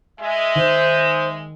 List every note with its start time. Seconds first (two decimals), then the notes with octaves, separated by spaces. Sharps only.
0.20 G#3 E5
0.56 D#3 C5